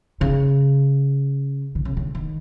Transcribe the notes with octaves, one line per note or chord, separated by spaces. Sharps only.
C#3
D3
C#3
D3
D#3